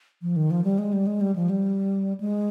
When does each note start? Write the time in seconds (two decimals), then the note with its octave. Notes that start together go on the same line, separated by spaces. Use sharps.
0.22 F3
0.36 D#3
0.51 F3
0.64 G3
0.79 G#3
0.93 G3
1.07 G#3
1.21 G3
1.36 F3
1.50 G3
2.20 G#3